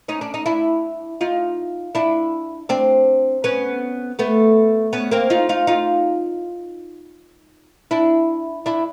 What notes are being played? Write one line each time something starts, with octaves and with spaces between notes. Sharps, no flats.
C#4 D#4
D4
D#4
D4 E4
D#4 F4
D4 E4
C4 D4
B3 C#4
A3 B3
B3 C#4
A#3 C4
D#4 F4
D#4 F4
D#4 F4
D4 E4
D4 E4